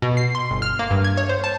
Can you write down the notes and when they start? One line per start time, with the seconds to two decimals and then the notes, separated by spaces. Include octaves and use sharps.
0.02 B2
0.17 C7
0.35 C6
0.51 G1
0.62 F6
0.79 A#3
0.91 G2
1.04 G#6
1.17 C#5
1.29 C5
1.44 A5